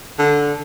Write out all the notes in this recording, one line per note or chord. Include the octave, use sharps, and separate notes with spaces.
D3